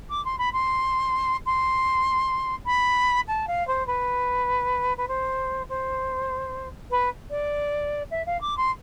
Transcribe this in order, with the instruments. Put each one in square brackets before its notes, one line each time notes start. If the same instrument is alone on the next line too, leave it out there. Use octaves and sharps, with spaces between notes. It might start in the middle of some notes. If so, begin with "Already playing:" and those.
[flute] D6
C6
B5
C6
C6
B5
A5
F5
C5
B4
B4
C5
C5
B4
D5
E5
F5
D6
C6